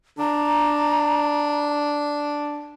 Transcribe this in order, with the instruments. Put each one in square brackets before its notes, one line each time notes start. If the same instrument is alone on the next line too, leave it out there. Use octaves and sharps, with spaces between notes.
[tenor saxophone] D4 [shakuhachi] A#5